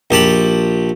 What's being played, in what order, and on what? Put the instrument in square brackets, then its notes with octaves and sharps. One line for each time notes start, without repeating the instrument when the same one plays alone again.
[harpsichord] A#1 G4 A5 B5